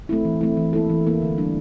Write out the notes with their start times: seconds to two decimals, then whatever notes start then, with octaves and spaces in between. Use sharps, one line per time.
0.09 A3 C4 E4
0.25 E3
0.41 A3 C4 E4
0.57 E3
0.73 A#3 E4 A4
0.90 E3
1.06 A#3 E4 A4
1.22 D3
1.38 G3 D4